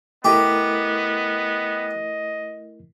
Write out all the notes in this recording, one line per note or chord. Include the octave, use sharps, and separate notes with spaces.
A3 B3 E4 G4 A#4 D#5